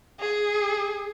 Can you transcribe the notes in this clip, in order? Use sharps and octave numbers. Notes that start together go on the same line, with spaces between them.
G#4